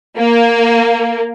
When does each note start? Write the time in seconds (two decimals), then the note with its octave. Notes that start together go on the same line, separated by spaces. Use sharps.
0.17 A#3